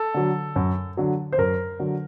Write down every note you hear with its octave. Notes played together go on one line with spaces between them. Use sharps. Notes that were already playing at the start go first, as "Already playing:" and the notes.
Already playing: A4
D3 F#3
F#2
D3 F#3
C5
F#2 A#4
D3 F#3